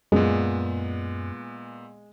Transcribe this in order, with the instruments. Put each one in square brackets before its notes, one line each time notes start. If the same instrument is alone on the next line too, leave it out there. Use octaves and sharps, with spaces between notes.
[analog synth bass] F#2 [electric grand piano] A#2 B3 [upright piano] G#3